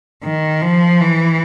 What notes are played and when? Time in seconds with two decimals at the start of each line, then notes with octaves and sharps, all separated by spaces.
0.23 D#3
0.62 F3
1.01 E3